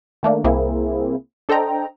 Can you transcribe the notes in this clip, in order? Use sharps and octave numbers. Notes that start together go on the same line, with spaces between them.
D#3 A3 A#3 D4
C2 A#3 C4 E4 G#4
D4 A4 C5 D#5 G5 A#5